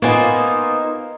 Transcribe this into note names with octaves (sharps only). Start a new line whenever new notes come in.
A#3 B3 D#4 F4 C5 G#5